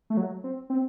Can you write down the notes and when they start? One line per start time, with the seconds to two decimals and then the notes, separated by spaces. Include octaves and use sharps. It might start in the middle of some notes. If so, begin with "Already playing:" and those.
0.10 A3
0.17 F#3
0.44 C4
0.70 C4